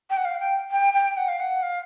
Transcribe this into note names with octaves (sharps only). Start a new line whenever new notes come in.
G5
F#5
F5
G5
G5
G5
F#5
F5
F#5
F5